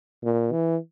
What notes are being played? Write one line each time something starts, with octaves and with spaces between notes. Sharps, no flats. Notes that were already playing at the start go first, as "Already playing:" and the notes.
A#2
E3